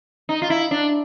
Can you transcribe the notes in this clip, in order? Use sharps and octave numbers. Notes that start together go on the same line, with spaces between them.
D#4
F4
E4
D4